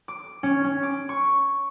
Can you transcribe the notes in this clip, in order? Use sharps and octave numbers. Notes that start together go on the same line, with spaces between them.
D6
C#4
C#4
D6
C#6